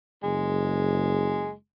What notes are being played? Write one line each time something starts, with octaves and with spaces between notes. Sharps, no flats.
F#1 G#3